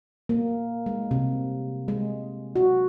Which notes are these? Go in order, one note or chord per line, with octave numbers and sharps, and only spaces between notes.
A#3
G#3
C3
G#3
F#4